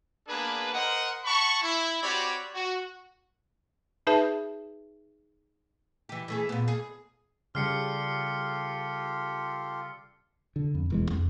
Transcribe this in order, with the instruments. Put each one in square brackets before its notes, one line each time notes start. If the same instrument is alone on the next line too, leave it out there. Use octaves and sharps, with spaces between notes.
[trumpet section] A#3 B3 D4 G#4 B4
A#4 C5 D#5 F#5
F#5 A5 B5 C#6
E4
C4 F#4 G4 C#5 D5 B5
F#4
[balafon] D#4 G#4 B4 E5 A5
[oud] E3 G4
E3 A3 G#4
A#2 B3
G#4
[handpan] C#3 G3 [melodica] F4 G4 A4 [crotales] F6 C7 C#7
[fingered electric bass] D3
F2
E1 E3 G#3
F2